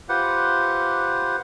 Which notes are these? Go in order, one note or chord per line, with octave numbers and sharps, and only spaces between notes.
F4 G4 B4 C5 F#5